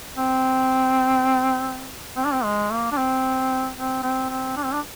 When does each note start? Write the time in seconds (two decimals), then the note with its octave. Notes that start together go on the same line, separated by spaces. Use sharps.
0.17 C4
2.16 C4
2.25 D4
2.33 C4
2.44 G#3
2.71 A#3
2.92 D4
2.97 C4
3.77 C4
4.03 C4
4.30 C4
4.56 D4
4.65 C4
4.72 D4